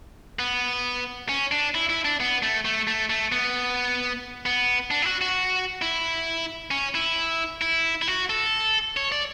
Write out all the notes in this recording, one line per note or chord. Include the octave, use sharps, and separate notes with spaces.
B3
C#4
D4
E4
E4
D4
B3
A3
A3
A3
A3
B3
B3
D4
E4
F#4
F#4
E4
C#4
E4
E4
E4
F#4
A4
C#5
D5